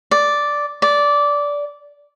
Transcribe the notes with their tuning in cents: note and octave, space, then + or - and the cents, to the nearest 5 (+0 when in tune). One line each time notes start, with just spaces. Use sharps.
D5 -5
D5 -15